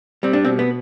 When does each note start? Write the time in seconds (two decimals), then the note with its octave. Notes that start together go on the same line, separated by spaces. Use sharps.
0.23 G3 C4
0.33 D4
0.45 B2 C4
0.59 B3